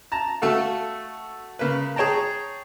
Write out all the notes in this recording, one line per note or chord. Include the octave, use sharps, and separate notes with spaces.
A5 A#5
A3 F#4 A4 F5
C#3 A#3 B4
G#4 C#5 G5 A5 A#5